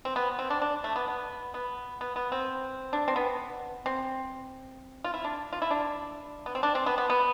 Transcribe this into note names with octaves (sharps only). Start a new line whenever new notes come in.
C4
B3
C4
D4
D4
A3
B3
B3
B3
B3
B3
C4
D4
C4
B3
C4
F4
E4
D4
F4
E4
D4
B3
C4
D4
C4
B3
B3
B3